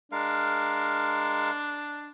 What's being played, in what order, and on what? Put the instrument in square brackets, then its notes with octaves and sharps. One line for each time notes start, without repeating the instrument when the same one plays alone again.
[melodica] G#3 A#4 F5 [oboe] D4